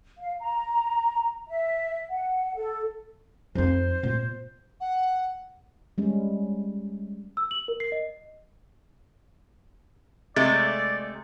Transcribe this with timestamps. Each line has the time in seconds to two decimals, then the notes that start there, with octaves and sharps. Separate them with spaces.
0.19 F5
0.40 A#5
1.49 E5
2.10 F#5
2.56 A4
3.55 F2 D#4 C5
4.03 A#2 B3
4.81 F#5
5.98 G3 G#3 C#4
7.37 E6
7.51 F#7
7.68 A#4
7.80 C7
7.92 D#5
10.36 C3 G#3 A3 D5 A6